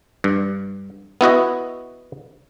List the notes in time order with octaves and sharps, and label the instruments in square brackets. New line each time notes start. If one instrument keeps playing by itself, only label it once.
[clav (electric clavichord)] G2
B3 E4 F#4 D#5